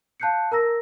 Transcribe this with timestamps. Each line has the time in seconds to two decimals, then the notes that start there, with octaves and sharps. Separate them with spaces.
0.20 F5 A5 F#6 G6 C7 C#7
0.52 A#4 A#5 E6 A#6